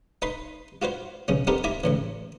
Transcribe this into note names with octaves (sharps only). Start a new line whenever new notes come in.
D#4 B4 B5 C6
F4 F#4 B4 C5
B1 C#3 C#4
B3 C4 D#4 G4 A4 A#4
D#4 E4 E5 A#5 D6 D#6
C#2 A2 E3